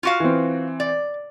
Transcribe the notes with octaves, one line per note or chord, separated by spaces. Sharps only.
F4 F#4 F5
E3 C4
D5